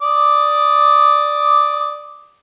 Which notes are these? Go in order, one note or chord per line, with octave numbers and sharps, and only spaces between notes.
D5 D6 D#6